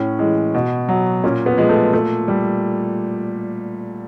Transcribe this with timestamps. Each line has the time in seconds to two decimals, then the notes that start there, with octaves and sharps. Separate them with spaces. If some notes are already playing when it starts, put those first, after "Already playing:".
Already playing: A2 C#4
0.19 E3 G#3
0.55 B2
0.89 F#3
1.24 A#2 C#4
1.46 B3
1.58 F3 G#3
1.69 A3
1.93 A#2 A3
2.28 G3